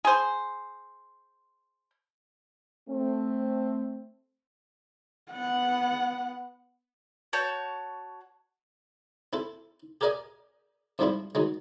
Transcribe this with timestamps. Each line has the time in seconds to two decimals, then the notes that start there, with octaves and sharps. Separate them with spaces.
0.05 G#4 C5
2.88 A3 C4
5.32 B3 F#5
7.33 F#4 C#5 A5 G6
9.33 C4 E4 A4
10.01 G4 G#4 A#4 D5 D#5 G#5
10.99 F2 G#2 F3 G3 C4 E4
11.35 D#3 F#3 G#3